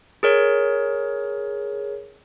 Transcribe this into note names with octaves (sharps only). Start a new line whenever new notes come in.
G#4 A#4 C#5